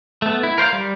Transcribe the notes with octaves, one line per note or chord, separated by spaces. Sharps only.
A3 B3
E4
A#4 C5 C#5 F5
G3